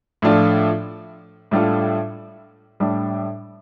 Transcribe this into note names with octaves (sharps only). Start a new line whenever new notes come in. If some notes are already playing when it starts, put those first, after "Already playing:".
A2 F3 A3 D4 F4
A2 G3 D4 F4 A4
A2 G3 D4